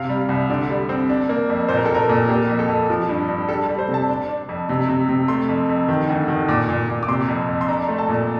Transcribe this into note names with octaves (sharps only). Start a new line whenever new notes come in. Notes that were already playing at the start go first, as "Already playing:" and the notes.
Already playing: C3 F5
G3
C2
D3 D5
G3
C4
D4
A#3
F2
A#2 C5
A#4
A#2 A4
A#4
A#2
A#3 G4
F2
A4
F2
F3
G2
G2
G3 A4
A4
G3
C5
C3
A5
D4
D4
F2
C3
C3
C3
A3 C6
F2
F2
D#3
D2
D#3
A#2 D6
A#2
A#2
D6
C3 C6
F2
F2
C6
D4 A#5
A3
A5
A#2